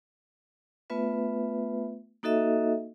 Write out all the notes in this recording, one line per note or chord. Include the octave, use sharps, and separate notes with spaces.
A3 B3 F4 B4 E5
A#3 D#4 F#4 A4 D#5 E5